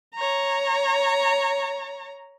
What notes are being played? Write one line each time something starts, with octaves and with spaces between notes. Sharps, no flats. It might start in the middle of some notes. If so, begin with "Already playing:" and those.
C#5 A#5